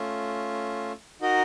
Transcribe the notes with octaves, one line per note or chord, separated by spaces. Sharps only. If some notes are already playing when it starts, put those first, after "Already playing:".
Already playing: A3 C#4 F4
D#4 F#4 A#4 D#5